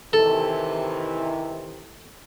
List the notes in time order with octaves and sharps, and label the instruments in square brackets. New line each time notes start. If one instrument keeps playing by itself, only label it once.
[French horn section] C3 D#3 E3 [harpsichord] A4